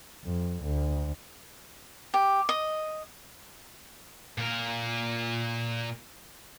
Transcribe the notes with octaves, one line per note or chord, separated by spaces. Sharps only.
F2
D2
G4
D#5
A#2 A#4